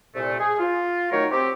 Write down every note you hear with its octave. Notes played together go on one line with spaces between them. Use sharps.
C2 A#2 A3
G#4
F4
D#3 F#3 A3 D#4 A#4 C#5
C4 G4